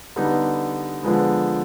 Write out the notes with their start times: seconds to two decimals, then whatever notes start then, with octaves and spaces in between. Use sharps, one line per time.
0.16 D3 G3 B3 D#4
1.03 D3 F3 G#3 B3